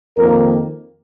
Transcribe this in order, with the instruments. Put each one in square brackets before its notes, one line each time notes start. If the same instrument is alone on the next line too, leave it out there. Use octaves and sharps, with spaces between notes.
[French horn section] F2 D#3 A#3 A#4